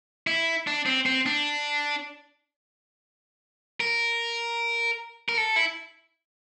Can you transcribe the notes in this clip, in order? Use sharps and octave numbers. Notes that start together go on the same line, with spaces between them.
E4
D4
C4
C4
D4
A#4
A#4
A4
E4